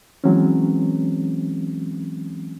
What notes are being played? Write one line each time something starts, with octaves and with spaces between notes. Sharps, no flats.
E3 F#3 G#3 C4 C#4